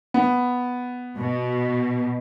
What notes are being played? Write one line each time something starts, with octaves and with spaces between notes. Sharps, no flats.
B3
B2